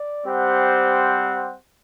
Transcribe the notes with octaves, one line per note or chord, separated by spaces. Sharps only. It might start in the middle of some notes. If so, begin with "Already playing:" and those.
Already playing: D5
G3 C4 G4 C5 F#5